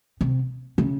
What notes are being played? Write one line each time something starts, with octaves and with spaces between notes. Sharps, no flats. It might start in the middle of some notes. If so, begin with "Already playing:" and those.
C3
C#3